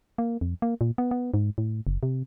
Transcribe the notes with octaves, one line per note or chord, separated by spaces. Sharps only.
A#3
F2
A#3
A#2
B3
B3
G#2
A2
F#1
C3